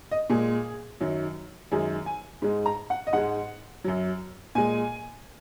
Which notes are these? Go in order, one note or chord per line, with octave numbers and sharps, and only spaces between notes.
D#5
A#2 G#3 G#4
F#2 D#3 F#3
F#2 D#3 G#3 G#4
G#5
G#2 G#3
A#5
F#5
D#5
G#2 G#3 F#5
F#2 F#3
A#2 G#3 G#5